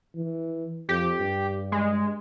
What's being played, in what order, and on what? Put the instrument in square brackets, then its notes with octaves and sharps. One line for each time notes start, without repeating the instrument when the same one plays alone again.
[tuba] E3
[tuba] F2 [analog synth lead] G4
[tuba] G2
[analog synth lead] G#3